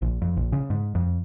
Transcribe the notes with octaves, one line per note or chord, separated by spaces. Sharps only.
A#1
F2
A#1
C#3
G#2
F2